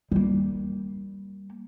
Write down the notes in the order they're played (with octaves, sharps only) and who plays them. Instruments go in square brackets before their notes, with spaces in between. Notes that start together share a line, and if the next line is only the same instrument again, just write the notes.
[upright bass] G3 A#3